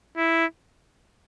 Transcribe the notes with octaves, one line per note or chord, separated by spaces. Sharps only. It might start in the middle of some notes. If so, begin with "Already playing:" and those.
E4